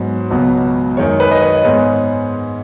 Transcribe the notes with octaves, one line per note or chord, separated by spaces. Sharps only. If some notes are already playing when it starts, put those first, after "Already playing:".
Already playing: G#2 F#3 B3
C#2 B2 F#3 B3
F#2 D#3 G#3 C#5
B4
D#5
C#5
G#2 G#3 B3